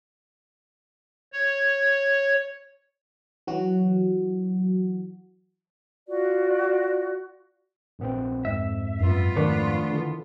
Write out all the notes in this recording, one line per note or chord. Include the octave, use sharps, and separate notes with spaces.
C#5
E3 F#3 F#4
F4 F#4 D5
A#1 B3 C4
F2 G#2 E5
F#2 B3 F4
D#3 F3 A3 D4
D3 E3